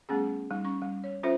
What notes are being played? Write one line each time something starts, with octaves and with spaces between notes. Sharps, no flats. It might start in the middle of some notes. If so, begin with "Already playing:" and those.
G3 A3 B3 C#4 G#4
G3 D#4
C#4 C#6
G3
C#5
C#4 F4 A4 C5 E5